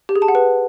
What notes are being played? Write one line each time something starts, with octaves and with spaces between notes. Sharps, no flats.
G4
G#4
A5
F#5
B4